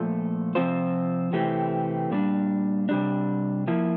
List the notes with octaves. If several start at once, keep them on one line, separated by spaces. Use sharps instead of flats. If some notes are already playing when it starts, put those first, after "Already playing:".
Already playing: A#2 F3 A3
C3 F3 C4 F4 C5
C3 E3 A3 C4 G4
A#2 G3 D4
C3 G3 D4
F3 A#3 E4